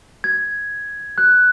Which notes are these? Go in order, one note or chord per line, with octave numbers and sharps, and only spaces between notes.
G#6
F#6